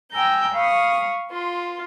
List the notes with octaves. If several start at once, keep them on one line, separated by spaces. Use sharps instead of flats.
G5 G#5 A#5 E6 G6
F5 B5 C#6 D#6
F4 C6